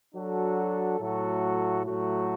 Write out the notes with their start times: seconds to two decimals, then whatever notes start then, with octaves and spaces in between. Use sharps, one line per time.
0.14 F#3 D4 F#4 A4
1.00 A2 F#3 A3 F#4 A4
1.86 A2 F#3 A3 F#4